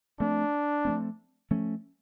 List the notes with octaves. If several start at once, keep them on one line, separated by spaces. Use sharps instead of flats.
F3 A3 C4 D4
F3 A3 C4
F3 A3 C#4